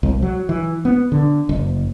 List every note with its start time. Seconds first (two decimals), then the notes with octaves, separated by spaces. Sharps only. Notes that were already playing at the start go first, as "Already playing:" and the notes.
0.03 C2
0.22 F#3
0.49 E3
0.85 B3
1.12 D3
1.49 F#1